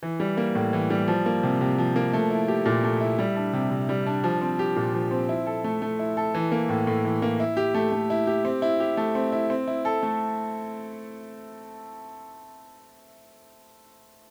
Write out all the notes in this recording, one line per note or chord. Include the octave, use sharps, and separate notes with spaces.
E3
G3
A#3
A2
E3
G3
F3
A#3
C3
C3
F3
A#3
A3
E4
G4
A#2
A3
E4
G3
D4
C3
C3
G3
D4
F3
C4
G4
A#2
F3
C4
E4
A4
A3
A3
E4
A4
E3
A#3
A2
A2
E3
A#3
E4
G4
A3
A3
E4
G4
C4
E4
G4
A3
C4
E4
C4
E4
A4
A3